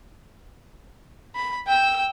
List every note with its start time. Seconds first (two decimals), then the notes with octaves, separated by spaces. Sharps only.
1.36 B5
1.67 G5 E6